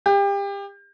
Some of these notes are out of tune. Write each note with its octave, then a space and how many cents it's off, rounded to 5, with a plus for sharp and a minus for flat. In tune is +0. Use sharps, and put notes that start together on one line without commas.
G4 +30